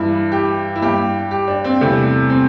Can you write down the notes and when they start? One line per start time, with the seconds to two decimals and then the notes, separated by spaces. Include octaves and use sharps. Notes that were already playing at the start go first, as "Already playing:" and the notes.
Already playing: G2 E3 G3 E4
0.32 G4
0.76 E4
0.82 G2 G3 G4
1.31 G4
1.48 D4
1.64 C4
1.81 E2 C3 G3 A3
2.30 C4